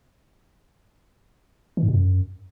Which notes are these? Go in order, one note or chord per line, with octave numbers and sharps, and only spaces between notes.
E3
G#2
B2
F#2